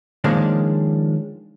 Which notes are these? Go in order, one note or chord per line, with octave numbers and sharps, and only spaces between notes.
D#3 F3 G#3 A#3 C#4 D4